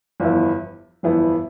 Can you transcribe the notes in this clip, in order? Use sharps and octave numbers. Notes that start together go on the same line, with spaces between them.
G1 F2 E3 B3 E4
G1 F2 E3 B3 E4